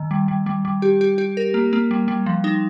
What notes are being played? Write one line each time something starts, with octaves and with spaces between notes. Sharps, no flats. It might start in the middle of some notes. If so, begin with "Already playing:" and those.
Already playing: D#3
G3
G3
G3
G3
G4
G4
G4
A#4
A#3
A#3
G3
G3
F3
D#4